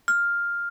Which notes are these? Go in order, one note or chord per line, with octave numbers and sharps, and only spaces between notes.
F6